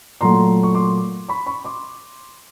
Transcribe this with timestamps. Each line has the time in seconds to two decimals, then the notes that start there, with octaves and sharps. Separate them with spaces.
0.21 A#2 F#3 A3 A#5 C6
0.63 C#6
0.74 C6 D6
1.29 B5 C#6
1.46 B5 C#6
1.64 C6 D6